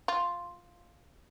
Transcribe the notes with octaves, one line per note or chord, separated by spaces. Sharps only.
F4